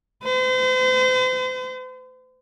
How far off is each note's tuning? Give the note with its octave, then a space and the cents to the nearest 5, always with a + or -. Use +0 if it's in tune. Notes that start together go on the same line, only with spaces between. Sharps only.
C5 -40